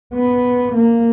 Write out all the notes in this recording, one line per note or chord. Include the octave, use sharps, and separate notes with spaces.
B3
A#3